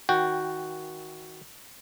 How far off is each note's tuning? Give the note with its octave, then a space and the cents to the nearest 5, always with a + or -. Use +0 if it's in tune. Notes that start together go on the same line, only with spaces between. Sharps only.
D#3 +25 F#4 +0 G5 +0